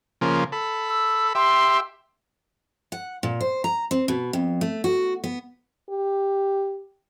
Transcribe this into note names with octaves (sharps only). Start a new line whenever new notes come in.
C#3 F3 A#3
A4 B5
E6
G4 E5 C6
F#5
A#2
C5
A#5
C4
B2
F2
A3
F#4
B3
G4